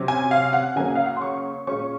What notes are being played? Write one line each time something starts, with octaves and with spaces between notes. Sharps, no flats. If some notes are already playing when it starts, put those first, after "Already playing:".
Already playing: C3 F#3 C#4
G#5
F5
F#5
C#3 F#3 A#3 C#4 G#5
F#5
F5
F#5
C6
C#6
A#2 G#3 C#4 C#6